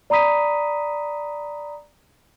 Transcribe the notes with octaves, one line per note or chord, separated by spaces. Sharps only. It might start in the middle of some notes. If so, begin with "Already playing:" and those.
D5 A#5 B5 D#6 B6 D#7